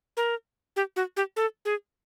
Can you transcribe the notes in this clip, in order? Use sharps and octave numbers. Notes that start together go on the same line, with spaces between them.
A#4
G4
F#4
G4
A4
G#4